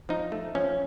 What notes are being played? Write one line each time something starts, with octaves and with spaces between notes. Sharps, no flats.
F3 D#4
A3
F3 C#4